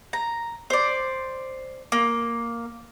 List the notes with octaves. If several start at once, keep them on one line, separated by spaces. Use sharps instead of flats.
A#5
C5 D5
A#3